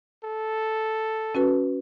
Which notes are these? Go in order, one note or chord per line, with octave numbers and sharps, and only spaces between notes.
A4
C#4 F#4 B4